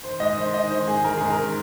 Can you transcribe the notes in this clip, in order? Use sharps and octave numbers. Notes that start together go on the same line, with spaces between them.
D#3 C5
G#2 D#5
D#3 C5
G#2 D#5
D#3 C5
G#2 G#4
D#3 A#4
G#4
G#2
A#4
D#3